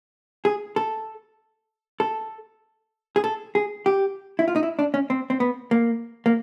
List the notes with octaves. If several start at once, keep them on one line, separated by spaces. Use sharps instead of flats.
G#4
A4
A4
G#4
A4
G#4
G4
E4
F4
D#4
E4
D4
C#4
C4
C4
B3
A#3
A#3